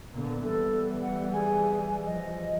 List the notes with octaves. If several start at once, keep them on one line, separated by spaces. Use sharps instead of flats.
A#2 D3 B3
E3 G3 A4
F#5
G#4 G#5
F3 D#5